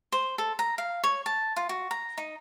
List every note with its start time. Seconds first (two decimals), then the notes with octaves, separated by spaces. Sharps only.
0.12 C5
0.38 A4
0.59 A#5
0.78 F5
1.04 C#5
1.26 A5
1.56 F4
1.69 F#4
1.91 A#5
2.18 D#4